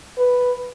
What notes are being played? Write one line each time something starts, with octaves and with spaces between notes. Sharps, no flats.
B4